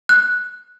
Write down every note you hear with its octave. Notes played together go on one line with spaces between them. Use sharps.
F#6